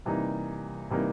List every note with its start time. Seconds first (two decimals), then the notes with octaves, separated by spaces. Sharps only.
0.05 C3 E3 G3 A#3 D#4
0.90 C3 E3 G3 A#3 D#4